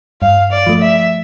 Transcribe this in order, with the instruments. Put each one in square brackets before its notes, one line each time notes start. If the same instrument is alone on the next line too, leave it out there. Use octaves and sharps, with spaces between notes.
[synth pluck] G2 [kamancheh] F5
[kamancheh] D5
[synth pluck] F3 A3
[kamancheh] E5